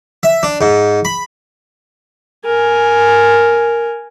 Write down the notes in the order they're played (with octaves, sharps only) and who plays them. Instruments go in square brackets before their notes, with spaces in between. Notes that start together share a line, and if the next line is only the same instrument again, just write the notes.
[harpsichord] E5
D4
G#2
B5
[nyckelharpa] A#4 G#5